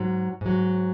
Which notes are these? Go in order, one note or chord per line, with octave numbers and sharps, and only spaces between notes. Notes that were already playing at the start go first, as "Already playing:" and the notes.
Already playing: G#2 F#3
G#2 F#3